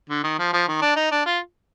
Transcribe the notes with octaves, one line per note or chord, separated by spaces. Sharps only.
D3
D#3
F3
F3
D#3
D4
D#4
D4
F4